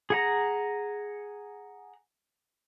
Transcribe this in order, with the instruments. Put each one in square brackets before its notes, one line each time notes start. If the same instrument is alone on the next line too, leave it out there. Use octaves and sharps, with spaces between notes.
[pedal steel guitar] G#4 F#5 A#5